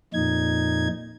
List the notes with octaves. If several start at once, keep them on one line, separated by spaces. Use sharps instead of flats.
F2 A#2 D#4 G#6